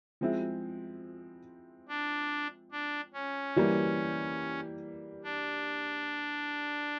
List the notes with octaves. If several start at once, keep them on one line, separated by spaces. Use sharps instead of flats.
F3 G#3 C4 E4
D4
D4
C#4
E3 G3 A#3
D4